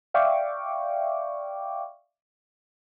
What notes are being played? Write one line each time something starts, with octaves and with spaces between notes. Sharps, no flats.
D5 E5 F5 G5 C#6 D6